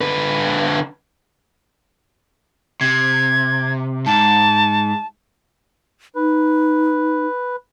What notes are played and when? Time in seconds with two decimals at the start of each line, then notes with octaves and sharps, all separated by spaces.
0.01 D3 B4
2.81 C3 G#6
4.06 G#2 A5
6.15 D#4 B4